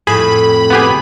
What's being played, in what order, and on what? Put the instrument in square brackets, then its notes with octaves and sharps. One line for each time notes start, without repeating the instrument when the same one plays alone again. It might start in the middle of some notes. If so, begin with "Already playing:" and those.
[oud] F2 A2 [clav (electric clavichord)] G#4 [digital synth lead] B5
[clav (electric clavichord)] B3 G4 G#4